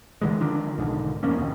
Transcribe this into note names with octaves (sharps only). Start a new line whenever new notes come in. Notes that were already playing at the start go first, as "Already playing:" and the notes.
D3 E3 G#3
D3 D#3 F3 D4
B1 G#2 D3 D#3
F2 F3 A#3 C#4
F#1 D#2 B2